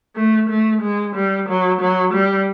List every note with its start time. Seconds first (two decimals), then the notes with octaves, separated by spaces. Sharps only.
0.16 A3
0.49 A3
0.82 G#3
1.16 G3
1.49 F#3
1.81 F#3
2.14 G3